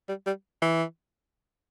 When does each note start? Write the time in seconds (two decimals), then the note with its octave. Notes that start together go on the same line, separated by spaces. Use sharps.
0.09 G3
0.26 G3
0.62 E3